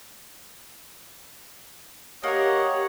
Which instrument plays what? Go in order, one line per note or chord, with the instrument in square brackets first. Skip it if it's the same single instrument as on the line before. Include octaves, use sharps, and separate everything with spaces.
[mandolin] A#3 A#4 [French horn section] G4 [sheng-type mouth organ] C#5 F#5 [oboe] D#5